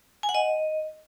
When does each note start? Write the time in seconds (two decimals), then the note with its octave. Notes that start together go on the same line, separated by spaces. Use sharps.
0.23 G#5
0.29 F#5
0.35 D#5